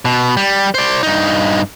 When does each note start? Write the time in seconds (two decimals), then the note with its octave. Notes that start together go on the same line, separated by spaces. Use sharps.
0.05 B2
0.37 G3
0.74 C5 D5
1.03 G2 D#4